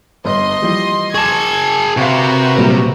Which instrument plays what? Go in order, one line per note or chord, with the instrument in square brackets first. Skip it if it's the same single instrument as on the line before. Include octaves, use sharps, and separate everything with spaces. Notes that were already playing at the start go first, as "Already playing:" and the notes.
[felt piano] G1 G2 [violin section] D#5 C6
[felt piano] E3 F3 G3
[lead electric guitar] G#4 A5 [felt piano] C#6 D6 [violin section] G#6
[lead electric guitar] C3 [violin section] F#4 A#4 B4 [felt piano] F5 F#5 C#6
[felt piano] A#2 F#3 G3